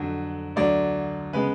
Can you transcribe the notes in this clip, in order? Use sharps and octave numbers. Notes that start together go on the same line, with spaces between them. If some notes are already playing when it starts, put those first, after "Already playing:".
Already playing: F2 D3 F#3
D2 D3 F#3 D5
C#3 G#3 B3 B4